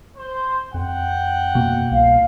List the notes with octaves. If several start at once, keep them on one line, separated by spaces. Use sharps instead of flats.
C5
F2 F#5 G5
B2 A#3
C2 F5